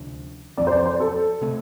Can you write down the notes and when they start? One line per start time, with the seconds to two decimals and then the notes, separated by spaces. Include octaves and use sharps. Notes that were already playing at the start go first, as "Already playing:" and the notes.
Already playing: D2 C3 F3 D4
0.57 F2 F3 C4 D5
0.67 C5
0.72 D5
0.86 C5
1.00 A4
1.41 C3 A3 C4